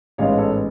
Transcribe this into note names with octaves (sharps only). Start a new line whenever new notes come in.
A1 G#2 G#3 B3 C#5 F5
A4 C#5